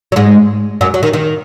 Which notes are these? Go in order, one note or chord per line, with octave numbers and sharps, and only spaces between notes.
F#3
G#2 G#3
F#2 F#3
F#3
D#3
D#3